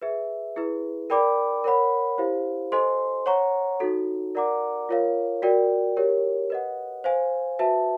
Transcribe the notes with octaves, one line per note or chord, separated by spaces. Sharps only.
G#4 B4 E5
E4 G#4 B4
A#4 D5 G5 B5 D6
A#4 C#5 F#5 B5
E4 G4 C5 F5
A4 C5 D#5 G#5 C6
C#5 F#5 A#5 C#6
D#4 F#4 A4
A#4 D5 F#5 A#5 D6
F4 A#4 C#5 F5
F#4 A#4 D5 G5
G4 A#4 C#5
B4 D#5 F#5
C5 F5 G#5
F#4 B4 E5 A5